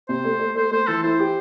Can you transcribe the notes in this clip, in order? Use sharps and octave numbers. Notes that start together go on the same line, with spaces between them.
C3 C5
A3
A3
A3 C5
A3 C5
E3 A4
E4 C5
G4